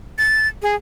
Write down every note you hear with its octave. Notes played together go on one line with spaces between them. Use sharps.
A6
G#4